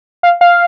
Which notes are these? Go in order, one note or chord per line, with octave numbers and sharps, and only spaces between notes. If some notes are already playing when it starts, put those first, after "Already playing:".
F5
F5